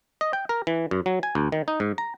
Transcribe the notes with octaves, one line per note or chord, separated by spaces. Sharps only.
D#5
G5
A#4
E3
F#2
F#3
G#5
D2
D#3
D#4
G#2
A#5